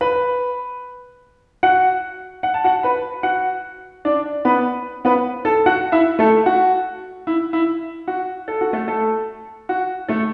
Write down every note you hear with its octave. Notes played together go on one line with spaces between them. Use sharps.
B4 B5
F#4 F#5
F#5
A5
F#4 F#5
B4 B5
F#4 F#5
D4 D5
B3 B4
B3 B4
A4 A5
F#4 F#5
E4 E5
A3 A4
F#4
E4
E4
F#4
A4
F#4
A3 A4
A3 A4
F#4
A3 A4